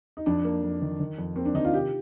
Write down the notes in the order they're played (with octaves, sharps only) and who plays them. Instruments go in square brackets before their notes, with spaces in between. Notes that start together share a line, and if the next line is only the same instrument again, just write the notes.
[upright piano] D#4
[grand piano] F2 [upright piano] D4
[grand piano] A#3
F2
D#3
D#3
F2
[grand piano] A#3 [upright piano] C4
[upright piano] D4
[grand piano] D#3 [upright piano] D#4
[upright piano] F4
[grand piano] C3 [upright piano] G4